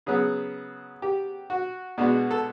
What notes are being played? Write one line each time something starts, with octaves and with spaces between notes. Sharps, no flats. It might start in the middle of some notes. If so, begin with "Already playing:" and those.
C#3 F#3 B3 G#4
G4
F#4
B2 G#3 B3 D4 F#4
A4